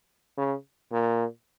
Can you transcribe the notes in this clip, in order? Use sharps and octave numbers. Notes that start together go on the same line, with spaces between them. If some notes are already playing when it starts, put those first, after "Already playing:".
C#3
A#2